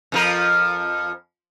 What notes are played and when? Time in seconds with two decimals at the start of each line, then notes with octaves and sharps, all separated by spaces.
0.12 F2 F3 A#4